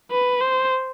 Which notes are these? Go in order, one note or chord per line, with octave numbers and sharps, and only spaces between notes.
B4
C5